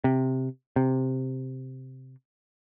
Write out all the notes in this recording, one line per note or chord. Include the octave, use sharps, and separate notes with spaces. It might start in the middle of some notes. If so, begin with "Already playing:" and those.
C3
C3